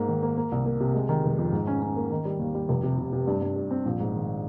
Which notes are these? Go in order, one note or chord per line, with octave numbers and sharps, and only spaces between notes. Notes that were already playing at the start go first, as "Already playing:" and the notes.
Already playing: G#2 A#3
D#3
A#3
A#3
C2
A#3
C3
G#3
D#3
F1
F2
G#2
C#4
C#4
A#3
D#3
G3
D#2
G3
F1
C3
C3
C3
G2
G2
G3
C4
A#1
G#2
D#3